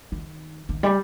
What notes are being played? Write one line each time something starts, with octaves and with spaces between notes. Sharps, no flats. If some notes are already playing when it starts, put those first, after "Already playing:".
D#3
D#3
G3